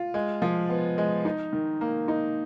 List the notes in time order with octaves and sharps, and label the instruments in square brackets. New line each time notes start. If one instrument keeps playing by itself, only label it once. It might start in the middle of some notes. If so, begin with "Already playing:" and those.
Already playing: [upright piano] F4
G#3
F3
B3
G#3
D#4
D#3
A#3
D#4